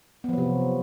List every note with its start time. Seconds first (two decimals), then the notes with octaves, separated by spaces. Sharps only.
0.24 B3
0.29 F3
0.33 F#3
0.38 C3